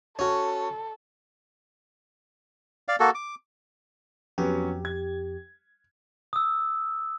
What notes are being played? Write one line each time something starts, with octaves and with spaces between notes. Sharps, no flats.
C#4 F#4 A4
D5 F5
A#3 F#4 A4
D6
F2 F#3 B3 C#4 G4
G#6
D#6 E6